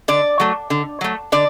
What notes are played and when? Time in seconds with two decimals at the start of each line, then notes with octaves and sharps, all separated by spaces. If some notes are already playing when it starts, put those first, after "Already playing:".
0.08 D3 D5
0.40 F#3 A3
0.70 D3
1.01 F#3 A3
1.32 D3 D5